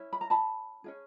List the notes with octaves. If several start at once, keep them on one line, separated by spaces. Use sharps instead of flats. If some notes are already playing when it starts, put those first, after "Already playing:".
Already playing: C#4 E4
B5
A#5
A5 B5
C#4 F4 G#4